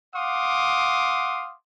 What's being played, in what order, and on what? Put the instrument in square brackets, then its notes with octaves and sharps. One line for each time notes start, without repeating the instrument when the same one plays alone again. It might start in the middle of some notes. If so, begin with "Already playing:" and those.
[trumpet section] F5 F#5 C6 D6 D#6